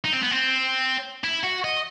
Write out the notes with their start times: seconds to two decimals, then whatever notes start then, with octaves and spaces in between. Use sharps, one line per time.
0.05 D#4
0.13 C4
0.23 B3
0.31 C4
1.24 E4
1.43 F#4
1.64 D#5